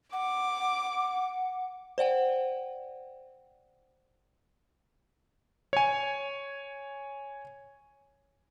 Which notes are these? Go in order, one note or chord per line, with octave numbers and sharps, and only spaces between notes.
F#5 D6
C5 D5 F#5 G5
C#5 G#5